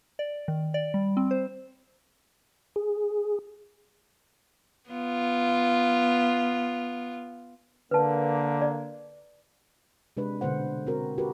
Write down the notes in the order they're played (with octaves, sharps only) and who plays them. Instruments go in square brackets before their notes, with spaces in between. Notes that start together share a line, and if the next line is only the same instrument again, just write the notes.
[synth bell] D5
D#3
D5
G3
C4
C5
[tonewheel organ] G#4
[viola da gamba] B3 F4
[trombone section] D3 A#3 [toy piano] B4 A5
[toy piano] D5
[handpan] C3 G#3 D4 B4
B2 D3 B3 C5 F#5
C4 F#4 A#4
F#4 G4 A#4 B4